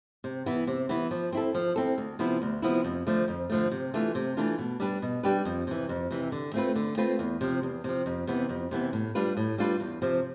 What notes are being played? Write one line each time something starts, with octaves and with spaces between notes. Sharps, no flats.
C3
E3 B3 E4
C3
E3 B3 E4
F3
C4 E4 A4
F3
C4 E4 A4
D2
C3 F3 B3 E4
D2
C3 F3 B3 E4
F2
D3 F3 A3
F2
D3 F3 A3
C3
E3 A3 D4 F4
C3
E3 A3 D4 F4
B2
G3 D4 G4 B4
B2
G3 D4 G4 B4
F2
C3 E3
F2
C3 E3
D3
A3 C4 F4 B4
D3
A3 C4 F4 B4
E2
C3 F3
E2
C3 F3
F2
C3 E3 B3
F2
C3 E3 B3
A2
G3 D4 F4 B4
A2
G3 D4 F4 B4
E2
C3 F3